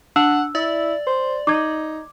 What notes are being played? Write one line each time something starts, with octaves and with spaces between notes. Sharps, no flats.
D4 F#5 E6
E4 D5
C5
D#4 D6 G#6